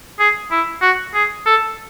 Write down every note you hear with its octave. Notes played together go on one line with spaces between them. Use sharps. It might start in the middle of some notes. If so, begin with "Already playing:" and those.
G#4
E4
F#4
G#4
A4